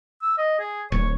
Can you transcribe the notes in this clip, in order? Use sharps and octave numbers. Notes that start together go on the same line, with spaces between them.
E6
D#5
G#4
D1 C#5